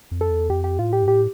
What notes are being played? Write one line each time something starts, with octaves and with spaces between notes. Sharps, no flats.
F2
A4
E2
F2 G4
G4
A2 F4
G4
G2
A2 G4